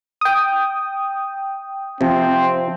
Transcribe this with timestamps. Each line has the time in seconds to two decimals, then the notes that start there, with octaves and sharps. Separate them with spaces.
0.21 G5 D#6
2.01 C3 F3 C4